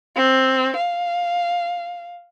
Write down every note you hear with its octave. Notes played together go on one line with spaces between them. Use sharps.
C4
F5